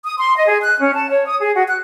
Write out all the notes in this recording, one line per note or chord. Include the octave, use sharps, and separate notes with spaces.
D#6
C6
D#5
G#4
F#6
C#4
A5
C#5
D#6
G#4
F#4
F#6